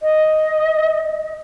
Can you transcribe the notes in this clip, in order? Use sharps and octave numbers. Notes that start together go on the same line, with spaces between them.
D#5